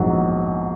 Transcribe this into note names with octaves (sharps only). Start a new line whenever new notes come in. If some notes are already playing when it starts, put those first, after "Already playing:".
Already playing: A#1 G#2 F#3